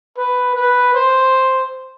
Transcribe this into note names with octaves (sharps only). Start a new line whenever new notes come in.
B4
B4
C5